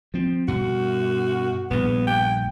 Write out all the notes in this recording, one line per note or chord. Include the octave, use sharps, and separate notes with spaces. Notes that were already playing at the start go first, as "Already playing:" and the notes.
F3 C4
G2 B2 F#4
A#1 G2 B3
G5